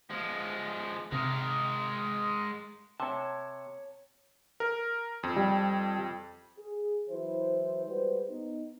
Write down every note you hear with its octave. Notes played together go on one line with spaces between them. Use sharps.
F3 G#3
C3 G#3 A#4
C3 C#5 A5
A#4
F2
G3
G#4
E3 F#3 E4 C5
G3 G#3 F#4 B4 C5
B3 D#4